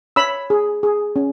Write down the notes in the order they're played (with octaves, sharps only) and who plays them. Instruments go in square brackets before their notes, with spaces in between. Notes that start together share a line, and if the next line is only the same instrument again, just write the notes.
[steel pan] C#5 B5 E6
G#4
G#4
C#4